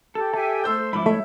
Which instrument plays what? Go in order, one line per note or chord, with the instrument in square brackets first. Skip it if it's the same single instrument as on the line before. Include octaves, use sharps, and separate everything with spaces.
[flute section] G4 [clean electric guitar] A4
[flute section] G4 E5 G#5 [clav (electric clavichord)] A5
[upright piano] A3 E6 G6 [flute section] C5 C6
[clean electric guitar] G#2 F3 E4 [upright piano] B5 [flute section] D6
[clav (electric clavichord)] A3 [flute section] C#5 [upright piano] E5